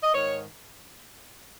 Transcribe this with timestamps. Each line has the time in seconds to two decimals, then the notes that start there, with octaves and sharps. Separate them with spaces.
0.03 D#5
0.15 G#2 D#3 C#5